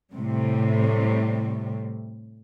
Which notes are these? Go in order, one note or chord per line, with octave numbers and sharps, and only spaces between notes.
A2 C3 G3